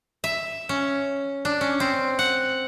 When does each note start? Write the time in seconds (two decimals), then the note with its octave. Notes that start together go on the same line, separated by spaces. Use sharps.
0.24 E5
0.69 C#4
1.45 D4
1.61 C#4
1.80 C4
2.19 F#5